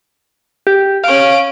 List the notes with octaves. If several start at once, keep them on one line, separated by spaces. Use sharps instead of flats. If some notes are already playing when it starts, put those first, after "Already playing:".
G4
C#4 F5 D7